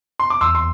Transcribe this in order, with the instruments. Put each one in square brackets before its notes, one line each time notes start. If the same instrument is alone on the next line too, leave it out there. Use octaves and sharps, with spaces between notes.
[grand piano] C6
D6
[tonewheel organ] E2 [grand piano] C6 E6
[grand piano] C6